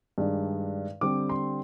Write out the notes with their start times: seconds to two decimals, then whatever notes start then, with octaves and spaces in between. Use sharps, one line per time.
0.18 G2 D#3 G#3 D4
1.01 D3 G3 C4 D6
1.29 C6